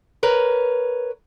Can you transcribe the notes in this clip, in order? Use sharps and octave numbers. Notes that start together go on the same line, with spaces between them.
A#4 B4 C#5